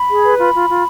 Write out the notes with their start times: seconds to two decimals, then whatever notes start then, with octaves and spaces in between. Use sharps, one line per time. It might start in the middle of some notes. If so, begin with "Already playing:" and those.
Already playing: B5
0.09 G#4
0.24 B4
0.39 F4 B5
0.54 F4
0.69 F4